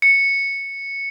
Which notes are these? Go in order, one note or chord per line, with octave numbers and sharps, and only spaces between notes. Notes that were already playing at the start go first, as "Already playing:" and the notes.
C#7